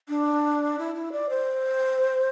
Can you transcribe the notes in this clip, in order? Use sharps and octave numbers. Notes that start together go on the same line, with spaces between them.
D4
E4
E4
D5
C5